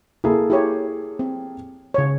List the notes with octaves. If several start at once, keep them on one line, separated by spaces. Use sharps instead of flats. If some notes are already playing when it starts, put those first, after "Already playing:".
A#3 E4 G#4 A4
E4 G4 C#5
C4
C#3 C#5